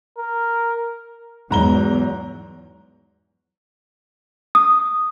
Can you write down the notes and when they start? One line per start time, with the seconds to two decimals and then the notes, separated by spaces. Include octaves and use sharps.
0.18 A#4
1.51 E2 G#2 F#3 A#5 G7
4.55 D#6